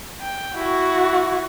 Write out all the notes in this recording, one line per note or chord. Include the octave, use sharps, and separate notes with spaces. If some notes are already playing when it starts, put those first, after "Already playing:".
G5
E4 F#4